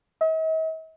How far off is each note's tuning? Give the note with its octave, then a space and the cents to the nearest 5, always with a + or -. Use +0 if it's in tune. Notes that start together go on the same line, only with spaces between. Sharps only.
D#5 +45